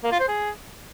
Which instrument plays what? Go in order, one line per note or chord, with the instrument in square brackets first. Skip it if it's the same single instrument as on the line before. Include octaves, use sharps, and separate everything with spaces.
[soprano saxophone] A#3
F4
C5
G#4